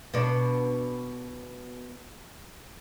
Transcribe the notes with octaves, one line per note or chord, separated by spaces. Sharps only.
B2 D4